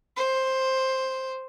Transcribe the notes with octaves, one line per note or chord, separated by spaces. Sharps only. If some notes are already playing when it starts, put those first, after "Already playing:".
C5